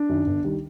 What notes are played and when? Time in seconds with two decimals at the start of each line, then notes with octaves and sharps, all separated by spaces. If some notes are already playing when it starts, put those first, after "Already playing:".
Already playing: D4
0.09 F#2 D#3
0.26 G1
0.44 D#3 G3